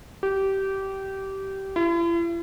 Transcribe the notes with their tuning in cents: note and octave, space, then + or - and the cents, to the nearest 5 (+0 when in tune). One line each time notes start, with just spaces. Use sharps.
G4 -20
E4 +45